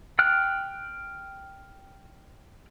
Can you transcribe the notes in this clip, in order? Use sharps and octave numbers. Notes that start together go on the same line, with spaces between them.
G5 F6 F#6